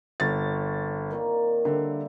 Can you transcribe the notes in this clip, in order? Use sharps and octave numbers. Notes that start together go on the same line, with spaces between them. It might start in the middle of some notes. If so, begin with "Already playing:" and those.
G1 C4 C#5 A6
A#2 D#3 A#3
D3 G3 C4 E5